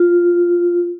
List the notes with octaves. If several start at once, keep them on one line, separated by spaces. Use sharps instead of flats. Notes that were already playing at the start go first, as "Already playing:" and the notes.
Already playing: F4